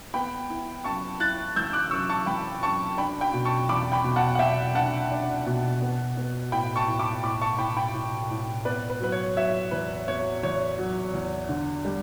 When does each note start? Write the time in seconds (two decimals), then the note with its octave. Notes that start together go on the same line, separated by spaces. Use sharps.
0.14 B3 G5 B5
0.50 E4
0.84 F#2 A5 C#6
1.20 E4 F#6 A6
1.56 E3 E6 G6
1.73 D6 F#6
1.91 F#2 C#6 E6
2.09 A5 C#6
2.26 E3 G5 B5
2.62 F#2 A5 C#6
2.97 D4 G5 B5
3.21 G5 B5
3.33 B2
3.45 A5 C#6
3.69 E2 B5 D6
3.92 G5 B5
4.04 B2
4.16 F#5 A5
4.35 F#5
4.39 B2 E5 G5
4.75 D4 F#5 A5
5.11 D4
5.46 B2
5.82 B3
6.17 B3
6.52 A2 G5 B5
6.76 A5 C#6
6.88 A2
6.99 B5 D6
7.23 A2 B5 D6
7.41 A5 C#6
7.58 A2 G5 B5
7.77 G5 B5
7.94 A2
8.30 A2
8.65 B3 B4 D5
8.90 B4
9.01 F#3 B4
9.12 C#5
9.37 F#3 C#5 E5
9.71 E2 B4
10.07 B3 C#5
10.43 E2 C#5
10.78 F#3
11.14 E2
11.49 D3
11.85 G3